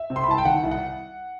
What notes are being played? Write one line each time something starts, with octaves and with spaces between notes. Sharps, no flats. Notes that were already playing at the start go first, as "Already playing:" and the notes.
Already playing: E5
C3
C6
B5
C2 A5
G5
D#3 F#5
C2
F#5